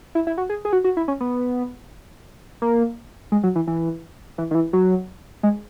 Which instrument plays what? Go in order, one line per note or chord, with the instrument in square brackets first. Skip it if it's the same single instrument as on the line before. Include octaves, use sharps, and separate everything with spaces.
[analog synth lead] E4
E4
F#4
G#4
G#4
F#4
F#4
E4
C#4
B3
A#3
G#3
F#3
E3
E3
E3
D#3
E3
F#3
G#3